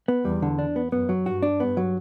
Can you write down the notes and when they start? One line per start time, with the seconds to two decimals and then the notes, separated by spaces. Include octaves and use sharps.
0.08 B3
0.25 E2 G3
0.42 D3
0.59 D4
0.76 B3
0.92 F#2 B3
1.09 F#3
1.26 G2 F#4
1.43 D4
1.60 G2 B3
1.77 F#3